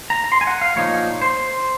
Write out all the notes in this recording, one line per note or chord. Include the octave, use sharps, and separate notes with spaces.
A#5
A#5
C6
G#5
F#5
F5
A#2 F3 A#3 D#4 C#5
C5